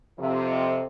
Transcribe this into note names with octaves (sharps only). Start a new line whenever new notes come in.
F2 C3 F3